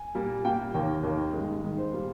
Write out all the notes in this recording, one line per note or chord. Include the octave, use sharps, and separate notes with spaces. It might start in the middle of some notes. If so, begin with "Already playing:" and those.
Already playing: G#5
A#2 G3 A#3
A#2 G3 A#3 G5
F5
D#2 D#3 A#3 G5
D#2 D#3 A#3
G2 D#3 G#3
G2 D#3 G#3
C5
A#2 G3 A#3